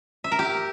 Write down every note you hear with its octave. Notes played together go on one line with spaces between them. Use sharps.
E5
A#4
G4